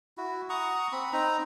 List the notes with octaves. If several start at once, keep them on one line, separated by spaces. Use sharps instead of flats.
E4 F#4
F#5 A#5 C#6 D#6
C4 B5
C4 D#4 A#5